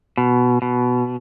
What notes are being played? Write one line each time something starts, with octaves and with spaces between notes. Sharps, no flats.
B2
B2